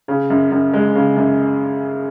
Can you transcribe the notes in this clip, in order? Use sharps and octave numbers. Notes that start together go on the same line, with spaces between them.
C#3
F#2
F#2
G#3
C#3
F#2